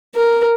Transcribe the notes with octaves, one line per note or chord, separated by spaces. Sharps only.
A#4